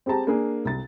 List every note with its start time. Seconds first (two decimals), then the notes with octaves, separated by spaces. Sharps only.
0.06 C4 G4 G#4 A5 A#5
0.27 A#3 D4 G#4
0.65 C2 A6